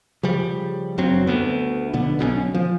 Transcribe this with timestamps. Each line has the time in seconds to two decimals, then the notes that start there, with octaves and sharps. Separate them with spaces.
0.23 C#3 F3 G3
0.98 F#1 G2 F#3 C4
1.27 D2 B3
1.93 A#1 B2 D3 B3
2.19 B1 B2 F#3 C#4
2.54 F3